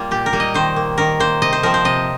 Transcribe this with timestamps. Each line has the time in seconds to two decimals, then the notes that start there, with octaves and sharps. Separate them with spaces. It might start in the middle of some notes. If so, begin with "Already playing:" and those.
Already playing: G3 A#3 F4
0.11 A#2 G4
0.26 A#4
0.33 G3 A#3
0.40 D#5
0.54 D#3 C5
0.76 A#3
0.98 D#3 A#4
1.20 A#3 C5
1.42 C3 D#5
1.53 C5
1.63 F3 C4 A#4
1.74 C5
1.85 C3 D#5